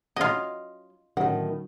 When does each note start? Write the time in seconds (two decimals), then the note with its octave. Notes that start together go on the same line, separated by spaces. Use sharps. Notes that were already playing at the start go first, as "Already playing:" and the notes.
0.16 F#3 C#4 D#4 F4 D#5
1.17 A2 D3 D#3 F#3 C#4 F#5